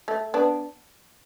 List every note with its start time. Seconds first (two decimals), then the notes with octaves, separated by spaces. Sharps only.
0.08 A3
0.34 B3 D4